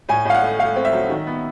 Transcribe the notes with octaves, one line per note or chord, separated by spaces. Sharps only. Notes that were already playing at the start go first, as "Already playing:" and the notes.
A2 G#5
A2 F5
F#5
A3
A3 F5
C4
E5
F#3
D#3
B3